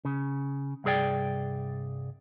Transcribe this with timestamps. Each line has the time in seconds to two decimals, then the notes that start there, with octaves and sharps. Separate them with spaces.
0.05 C#3
0.84 C2 G2 G#4 D5 G5